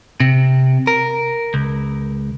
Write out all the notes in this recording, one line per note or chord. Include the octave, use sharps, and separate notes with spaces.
C3
A#4
C#2